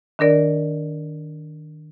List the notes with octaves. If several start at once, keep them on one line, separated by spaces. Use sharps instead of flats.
D#3 D4 A#4 D5